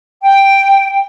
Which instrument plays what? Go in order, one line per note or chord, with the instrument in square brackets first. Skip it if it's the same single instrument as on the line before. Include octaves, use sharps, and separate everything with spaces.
[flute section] G5